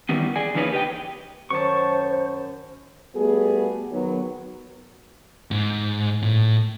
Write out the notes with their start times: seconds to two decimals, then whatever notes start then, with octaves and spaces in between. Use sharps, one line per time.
0.09 D#3 E3 G3 B3
0.36 G#4 D5 G#5
0.55 D3 E3 A#3 D#4 B4 C#5
0.72 G4 B4 D#5 G5
1.50 F#2 D#3 C5 C#5 A5 C#6
3.15 G3 A3 B3 F#4 G#4
3.91 D#3 F#3 B3
5.51 G#2
6.22 A2